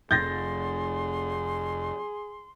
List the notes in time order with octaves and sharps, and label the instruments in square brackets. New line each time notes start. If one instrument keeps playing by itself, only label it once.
[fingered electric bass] F1 F2 [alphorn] G#4 [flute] C6 [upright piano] G6 A6 A#6